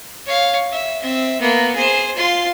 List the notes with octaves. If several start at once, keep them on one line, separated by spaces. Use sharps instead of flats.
C#5 F5
E5
C4 E5
A#3 B3
G#4 C5
F4 C6